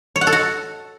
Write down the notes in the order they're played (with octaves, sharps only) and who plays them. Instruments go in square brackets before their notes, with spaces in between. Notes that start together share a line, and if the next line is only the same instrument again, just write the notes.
[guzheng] C#5
F#5
A4
F#4